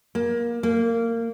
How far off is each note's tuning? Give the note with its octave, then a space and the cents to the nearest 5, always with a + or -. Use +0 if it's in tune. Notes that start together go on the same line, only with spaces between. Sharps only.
A#3 +20
A#3 -20